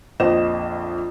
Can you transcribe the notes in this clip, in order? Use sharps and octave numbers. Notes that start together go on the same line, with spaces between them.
A#1 F2 C5 D#5 E7